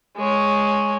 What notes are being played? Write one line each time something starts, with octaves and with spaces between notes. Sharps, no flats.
G#3 C#5